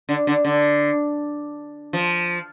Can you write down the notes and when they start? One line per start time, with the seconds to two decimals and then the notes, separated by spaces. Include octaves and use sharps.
0.09 D3
0.27 D3
0.45 D3
1.93 F3